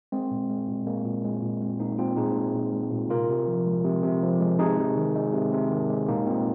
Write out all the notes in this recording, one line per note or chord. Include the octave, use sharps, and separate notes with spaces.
G#3 C4
A#2
G#3
A#2
G#3 A#3
A#2
G#3
A#2
G#3 C4
A#2 A#3 D#4
G#3 C4 F4
A#2 D#4 G#4
G#3
A#2
G#3
A#2
C3 F4 A#4
C3
F3
G#3
C3
C3
F3
G#3
C3 D#4 G#4
C3
D#3
G#3
C3
C3
D#3
G#3
A#2 A#3 D#4
A#2 C4